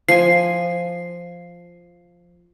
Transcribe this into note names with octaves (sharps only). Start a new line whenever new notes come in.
F3 G#5 C7